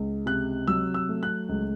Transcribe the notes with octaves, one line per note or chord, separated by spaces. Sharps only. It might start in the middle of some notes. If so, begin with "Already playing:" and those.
Already playing: C#2
C3 F#6
F#3 E6
E6
A3
F#6
C#2